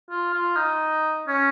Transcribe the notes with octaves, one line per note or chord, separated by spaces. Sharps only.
F4
F4
D#4
C#4